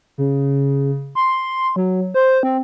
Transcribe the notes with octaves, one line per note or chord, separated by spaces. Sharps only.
C#3
C6
F#3
C5
C4